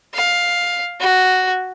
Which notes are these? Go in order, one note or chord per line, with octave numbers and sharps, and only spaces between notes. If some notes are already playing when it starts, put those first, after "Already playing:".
F5
F#4